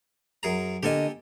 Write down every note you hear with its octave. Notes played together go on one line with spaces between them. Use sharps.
F#2 G#4 A#5
D3 A#3 G4 A4 D#5 G#5